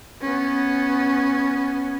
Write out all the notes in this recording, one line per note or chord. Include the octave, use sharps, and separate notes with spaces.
B3 C#4